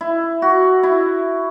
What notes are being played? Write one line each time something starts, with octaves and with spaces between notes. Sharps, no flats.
E4
F#4
E4